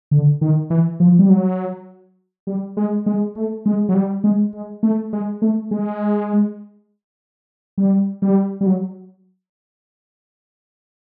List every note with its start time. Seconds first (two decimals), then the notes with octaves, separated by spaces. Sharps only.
0.11 D3
0.41 D#3
0.70 E3
1.00 F3
1.19 G3
1.30 F#3
2.47 G3
2.77 G#3
3.06 G#3
3.35 A3
3.66 G#3
3.89 F#3
3.94 G3
4.24 G#3
4.53 G#3
4.83 A3
5.13 G#3
5.42 A3
5.71 G#3
7.78 G3
8.22 G3
8.61 G3
8.66 F#3